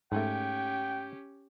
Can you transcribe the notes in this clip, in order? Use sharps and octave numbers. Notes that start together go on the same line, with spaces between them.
G#2 A3 C#4 G4 G5